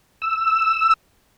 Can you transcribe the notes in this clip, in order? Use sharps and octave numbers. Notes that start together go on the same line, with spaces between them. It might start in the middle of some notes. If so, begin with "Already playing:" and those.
E6